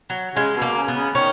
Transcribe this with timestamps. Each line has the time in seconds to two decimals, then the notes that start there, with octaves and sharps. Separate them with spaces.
0.10 F#3
0.35 C#3 G#3
0.56 B2
0.62 A#3
0.75 C#3
0.88 B3
0.95 C#3
1.15 D#3 C#4